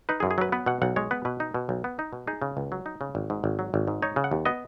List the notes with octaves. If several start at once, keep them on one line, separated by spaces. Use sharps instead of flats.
D#4 B4
F#2 G#4
G#4
F#3 B4
B3 B4
B2 F#5
B1 F#5
G#3 C#5
B3 B4
B2 B4
D#4
B2
B1
B3
D#4
B2
D#4 G#4
C#3
C#2
F#3
D#4
C#3
G#1
G#2
G#1
F#3
G#1
G#2
D#4 C#5
C#3
F#5
D#2
B3 D#5